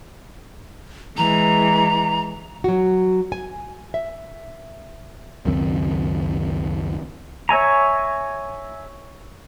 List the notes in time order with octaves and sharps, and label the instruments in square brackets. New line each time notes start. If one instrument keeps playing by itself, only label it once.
[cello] E3 G#3 [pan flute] A#5
[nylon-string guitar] F#3 F#4
G#5
E5
[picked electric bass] C#2 F#2 D#3 C4
[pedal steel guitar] C#5 E5 G#5 A#5